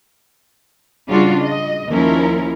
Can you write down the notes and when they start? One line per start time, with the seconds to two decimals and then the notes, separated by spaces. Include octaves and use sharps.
1.08 C#3 G3 D4 F4 F#4
1.41 D#5
1.90 D#2 F3 C#4 E4 A#4